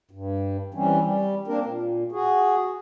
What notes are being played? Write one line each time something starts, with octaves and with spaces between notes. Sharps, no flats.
G2
E3 G3 C4 C#4
G3
A#3 C4 D4 A#4
A#2
F#4 G#4